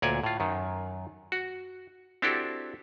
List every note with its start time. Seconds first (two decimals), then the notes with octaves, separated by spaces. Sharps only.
0.02 D2 A#2 C#5 D5 G#5
0.24 A2 F4
0.40 F#2 D#3
1.32 F#4
2.22 C4 D4 E4 F#4 G4 A4